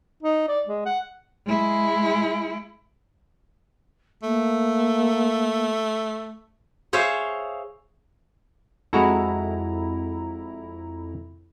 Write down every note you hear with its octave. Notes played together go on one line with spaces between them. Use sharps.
D#4
D5
G#3
F#5
G#3 E4
A3 A#3
G#4 C5 C#5 E5 F5 G#5
F2 G#3 E4 F#4 A4 A#5